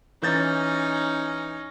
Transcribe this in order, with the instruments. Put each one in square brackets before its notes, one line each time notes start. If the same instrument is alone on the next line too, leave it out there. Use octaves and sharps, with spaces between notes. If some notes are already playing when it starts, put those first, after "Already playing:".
[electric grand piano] E3 G6 A6 [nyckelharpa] C#4 D#4